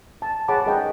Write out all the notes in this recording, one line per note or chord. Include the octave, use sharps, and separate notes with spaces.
A5
G#4 C#5 F#5 A5 B5 D6
G#4 A#4 D#5 F#5 G5